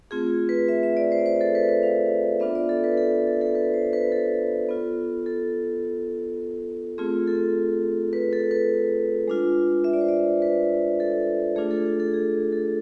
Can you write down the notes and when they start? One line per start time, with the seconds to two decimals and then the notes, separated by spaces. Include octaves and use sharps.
0.11 A3 C4 F4 G#4
0.49 B4
0.68 E5
0.83 E5
0.97 D5
1.12 C5
1.26 C5
1.41 A4
1.55 B4
1.69 B4
1.83 F5
2.40 B3 D4 F4 E5
2.55 D5
2.69 A4
2.84 B4
2.97 A4
3.12 A4
3.27 A4
3.41 A4
3.55 B4
3.74 C5
3.93 B4
4.12 A4
4.69 B3 F4
5.26 A4
6.98 A3 C4 F4 G#4
7.28 A4
8.13 B4
8.33 A4
8.51 B4
9.28 G#3 D4 F4
9.84 E5
9.93 D5
10.01 C5
10.09 D5
10.42 B4
11.00 A4
11.56 A3 D4 F4 G#4
11.71 A4
11.85 G#4
12.00 A4
12.14 G#4
12.52 A4